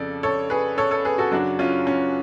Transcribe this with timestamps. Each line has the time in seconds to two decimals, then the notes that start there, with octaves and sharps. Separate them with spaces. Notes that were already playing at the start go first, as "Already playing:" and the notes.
Already playing: F2 C#3 F3 A4 D5
0.23 A4 C#5
0.50 G#4 B4
0.78 A4 C#5
0.91 A4 C#5
1.05 G#4 B4
1.18 F#4 A4
1.31 F#2 C#3 F#3 D4 F#4
1.59 C#4 F4
1.87 C#4